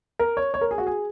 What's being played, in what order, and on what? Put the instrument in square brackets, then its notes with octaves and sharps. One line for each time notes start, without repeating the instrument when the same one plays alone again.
[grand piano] A#4
C#5
C#5
A#4
G#4
F#4
G#4